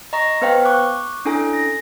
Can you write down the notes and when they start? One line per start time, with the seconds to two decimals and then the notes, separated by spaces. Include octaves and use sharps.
0.13 D#5 A#5 C#6 A#6
0.41 B3 B4 C5 F5 G5
0.65 C#6 D6 F#6
1.25 C#4 D4 E4 A4 G#5
1.53 A#6